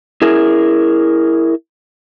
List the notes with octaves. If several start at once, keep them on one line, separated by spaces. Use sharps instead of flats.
E4 G#4 A#4